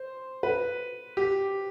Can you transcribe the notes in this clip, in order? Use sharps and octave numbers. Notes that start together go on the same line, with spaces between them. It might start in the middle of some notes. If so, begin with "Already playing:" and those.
Already playing: C5
B4
G4